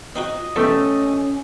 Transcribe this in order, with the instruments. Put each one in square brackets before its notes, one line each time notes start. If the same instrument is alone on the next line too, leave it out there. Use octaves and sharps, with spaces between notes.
[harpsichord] C4 D#4 F#4 [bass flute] F4 [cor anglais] D#5
[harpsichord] E2 E3 [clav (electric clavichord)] A3 G4 A4 [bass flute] C#4